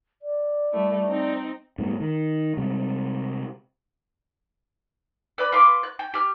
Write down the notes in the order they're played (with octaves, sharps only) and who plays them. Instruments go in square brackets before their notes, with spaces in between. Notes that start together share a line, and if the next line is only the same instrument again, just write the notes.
[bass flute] D5
[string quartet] G3 A3 E4
C4 D#4
[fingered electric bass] G#2 G3 A3 B3
D#3
C3 G3 G#3
[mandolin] B4 D5 B5
F4 B4 C6 D6
F#6
G5
G4 F6